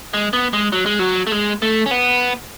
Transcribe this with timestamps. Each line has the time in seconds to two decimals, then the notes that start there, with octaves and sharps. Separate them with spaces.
0.14 G#3
0.33 B3
0.53 G#3
0.72 F#3
0.86 G#3
0.99 F#3
1.27 A3
1.32 G#3
1.62 A3
1.86 C#4
1.91 B3